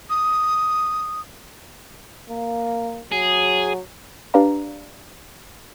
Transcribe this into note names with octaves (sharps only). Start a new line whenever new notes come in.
D#6
A#3
F#3 G#4
D4 G4 B4 D5 F5 A#5